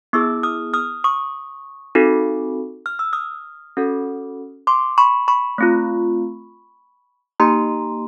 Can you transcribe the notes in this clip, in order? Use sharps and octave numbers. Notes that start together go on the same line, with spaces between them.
B3 E4 G#4 D6 E6
D#6 F6
D#6 F6
C#6 D#6
C4 D#4 F#4 A4
F6
E6
D#6 F6
C#4 F#4 A4
C6 D6
B5 C#6
B5 C#6
A3 C4 F4
A#3 D#4 G4 A#5 C6